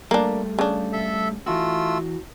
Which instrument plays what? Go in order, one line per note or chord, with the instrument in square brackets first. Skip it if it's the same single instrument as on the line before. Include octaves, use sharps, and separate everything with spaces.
[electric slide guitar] G3 A3 [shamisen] A#3 D4
[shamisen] C#3 D4
[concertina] A4 E5
[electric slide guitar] E3 F#4 [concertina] A3 F4 E6